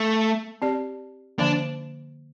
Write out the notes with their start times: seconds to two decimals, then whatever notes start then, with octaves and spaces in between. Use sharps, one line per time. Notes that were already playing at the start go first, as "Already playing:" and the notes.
Already playing: A3
0.62 C4 G4 D5
1.39 D3 F3 A#3 D4